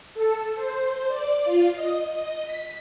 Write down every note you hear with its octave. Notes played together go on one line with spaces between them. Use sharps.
A4
C5
D5
F4
D#5
D#5
B6